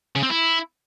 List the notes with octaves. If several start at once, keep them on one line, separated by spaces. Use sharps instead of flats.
C#3
C4
E4